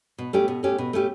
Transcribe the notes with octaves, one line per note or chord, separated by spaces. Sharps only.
B2
A3 C#4 G4
B2
A3 C#4 G4
B2
A3 C#4 G4